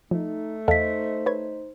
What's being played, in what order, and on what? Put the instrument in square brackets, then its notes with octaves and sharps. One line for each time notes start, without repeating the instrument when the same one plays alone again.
[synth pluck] F3 [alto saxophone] A3 [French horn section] D#4
[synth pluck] E2 A4 F5 [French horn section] D#4 C5 [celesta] D#5 B6
[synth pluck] B4 C#5 G#6